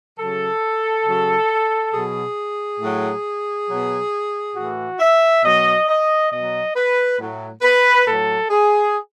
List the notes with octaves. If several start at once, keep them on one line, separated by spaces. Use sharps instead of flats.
C#3 F#3 A4
C#3 F#3
B2 F#3 G#4
A2 F#3
B2 F#3
A2 E3 F#4
E5
B2 F#3 D#5
D#5
B2 F#3 D#5
B4
A2 F#3
B4
A2 F#3 A4
G#4